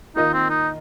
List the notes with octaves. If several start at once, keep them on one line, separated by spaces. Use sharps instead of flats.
D#3 A#3 D#4 F4 A#4 D#5
C4
D#4